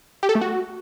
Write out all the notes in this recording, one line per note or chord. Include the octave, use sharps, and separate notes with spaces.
G4
A4
A3
F#4